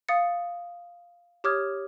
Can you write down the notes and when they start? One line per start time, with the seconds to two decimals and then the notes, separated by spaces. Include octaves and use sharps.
0.09 F5 D#6 A6 C#7
1.44 G4 C#5 D6 D#6 F6 G#6